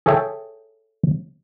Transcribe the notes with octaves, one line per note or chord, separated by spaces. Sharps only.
G#4 A4 C#5 E5 G5